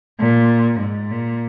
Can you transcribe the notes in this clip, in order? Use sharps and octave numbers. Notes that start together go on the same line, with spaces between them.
A#2
G#2
A#2